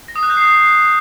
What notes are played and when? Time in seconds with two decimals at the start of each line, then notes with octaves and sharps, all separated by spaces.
0.08 A#6
0.16 D#6
0.23 F#6
0.30 G6
0.37 C7